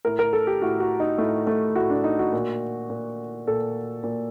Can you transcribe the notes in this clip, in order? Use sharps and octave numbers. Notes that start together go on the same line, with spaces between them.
A2 A#4
A#4
A4
G4
A2 F#4
F#4
D#4
A2 A3
A3
A2 F#4
D4
D#4
F#4
A#2
A#2
A#2 A4
A#2